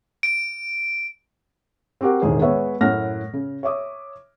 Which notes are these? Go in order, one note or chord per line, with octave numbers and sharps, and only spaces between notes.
D7
C4 F#4 G4 A#4 F#5
E1 D2 A2 D#3 G#4 C5
G#3 B3 C#5 E5
F#2 A2 F#5 F6 A#6
C#3
C#5 E5 D6 D#6